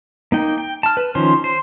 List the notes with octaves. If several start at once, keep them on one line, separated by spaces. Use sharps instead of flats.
A#3 D#4 G5
G5
A5 F6
B4
D#3 F3 C#4 C5
C5